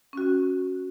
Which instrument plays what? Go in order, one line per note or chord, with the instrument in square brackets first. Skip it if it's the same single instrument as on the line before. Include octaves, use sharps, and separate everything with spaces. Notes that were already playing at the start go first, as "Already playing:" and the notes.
[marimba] C#4 F#4